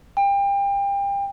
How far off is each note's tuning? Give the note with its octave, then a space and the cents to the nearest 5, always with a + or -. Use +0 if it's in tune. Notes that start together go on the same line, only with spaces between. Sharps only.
G5 +30